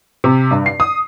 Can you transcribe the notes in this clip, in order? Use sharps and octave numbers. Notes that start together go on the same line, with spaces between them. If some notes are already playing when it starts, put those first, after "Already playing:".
C3
G2
C7
D#6